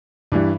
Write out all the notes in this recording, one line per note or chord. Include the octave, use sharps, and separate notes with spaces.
G2 E3 G3